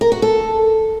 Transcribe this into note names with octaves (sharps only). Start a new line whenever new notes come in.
A#4
F#4
A4